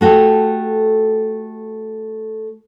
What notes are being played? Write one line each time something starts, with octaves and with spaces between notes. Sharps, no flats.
A3 F#4 G4 A4